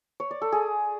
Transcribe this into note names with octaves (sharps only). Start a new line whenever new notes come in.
C#5
D5
A4
G#4